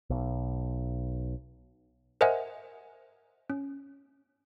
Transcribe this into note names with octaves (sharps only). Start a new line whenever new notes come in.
B1
A#4 C5 D#5 E5 F#5 G#5
C#4